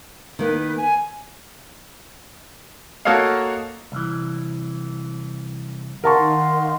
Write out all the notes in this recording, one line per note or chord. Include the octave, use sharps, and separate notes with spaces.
D#3 A#3 B4
G#5
A#3 F#4 A4 C#5 D#5 F5
C2 E3
D#3 A#4 F5 F#5 A5 C6 C#6